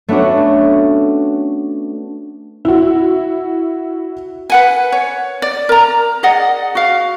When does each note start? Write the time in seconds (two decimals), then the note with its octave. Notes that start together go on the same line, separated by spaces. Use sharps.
0.08 A3 B3 C#4 D4 F#4
2.65 E4 F#4
4.50 B4 F#5 G#5
4.92 C#5
5.42 D5
5.69 A#4 A#5
6.23 G#4 D5 D#5 F#5
6.75 F#4 F5